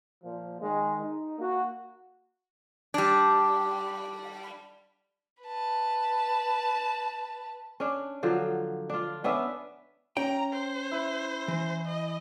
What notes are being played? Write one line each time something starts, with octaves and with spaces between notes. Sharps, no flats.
A#2 F3
D#3 G#3
D#4
A#3 F#4
G3 D4
B4 A5
C#4 D4
D3 F3 F#3
D4 F4
B3 C#4 D4 E5
C#4 G5 A#5
C5
E4
E3
D#5